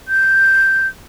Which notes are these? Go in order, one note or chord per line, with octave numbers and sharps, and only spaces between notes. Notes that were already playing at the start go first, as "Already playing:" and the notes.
G6